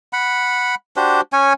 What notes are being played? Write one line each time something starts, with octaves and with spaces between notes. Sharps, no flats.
F#5 B5
D4 F#4 G4 C5
C#4 C#5 G#5